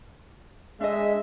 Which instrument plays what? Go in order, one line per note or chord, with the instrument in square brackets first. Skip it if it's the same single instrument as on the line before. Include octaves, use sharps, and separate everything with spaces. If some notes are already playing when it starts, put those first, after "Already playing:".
[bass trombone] G#3 [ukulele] D4 D#5 [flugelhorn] E5